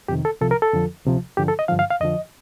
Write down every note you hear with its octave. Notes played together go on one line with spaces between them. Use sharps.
F2 C3 D#3 G4
A4
C2 C3 F3 A4
A#4
A4
F2 D3 F3
D2 C3 F3
G2 D3 F3 G4
A4
D#5
G2 D3 F3 F5
F5
F5
F2 D3 F3 D#5